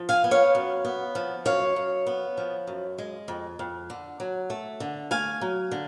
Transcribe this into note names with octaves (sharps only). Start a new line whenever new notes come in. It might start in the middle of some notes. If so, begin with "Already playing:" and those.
Already playing: F3
F5 G#5
B3
C#5 F5
F#2
B3
F3
F#2 C#5 F5
F#2
B3
F3
F#2
G#3
F2
F2
D3
F#3
A3
D3
A3 F5 G#5
F#3
D3